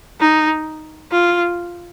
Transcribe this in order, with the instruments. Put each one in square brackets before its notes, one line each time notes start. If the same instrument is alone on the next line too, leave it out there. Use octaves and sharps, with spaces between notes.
[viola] D#4
F4